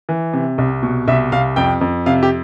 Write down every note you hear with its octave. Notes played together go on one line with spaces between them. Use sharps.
E3
C3
C2
B2
C2 E5
C2 F5
F2 G5
F2
C3 F5
G4